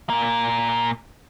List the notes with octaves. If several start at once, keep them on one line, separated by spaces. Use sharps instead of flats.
A#2 A#3